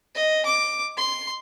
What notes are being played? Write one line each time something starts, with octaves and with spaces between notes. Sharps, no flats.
D#5
D6
C6